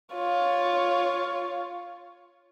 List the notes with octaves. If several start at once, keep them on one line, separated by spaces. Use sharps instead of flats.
F4 C#5